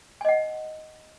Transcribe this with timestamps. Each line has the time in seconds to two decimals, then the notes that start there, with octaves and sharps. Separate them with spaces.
0.21 G#5
0.25 D#5
0.28 F#5